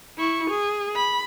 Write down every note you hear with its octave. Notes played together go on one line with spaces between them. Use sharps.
E4 C#6
G#4
B5